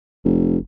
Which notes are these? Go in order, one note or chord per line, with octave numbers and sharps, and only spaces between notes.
F1